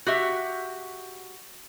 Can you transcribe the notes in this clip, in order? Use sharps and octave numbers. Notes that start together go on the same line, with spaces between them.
F#4 G4 E5